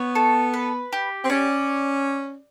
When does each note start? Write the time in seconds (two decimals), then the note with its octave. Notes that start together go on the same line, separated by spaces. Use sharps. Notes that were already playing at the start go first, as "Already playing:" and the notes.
Already playing: B3 C#5
0.15 A4
0.54 B4
0.93 G4
1.24 C4
1.30 C#4 D5